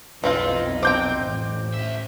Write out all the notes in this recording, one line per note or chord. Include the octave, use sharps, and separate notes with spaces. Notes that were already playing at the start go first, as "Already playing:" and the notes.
B1 F2 E3 C4 D#4 F4
C4 G5 D6 G6
A1
D2 E5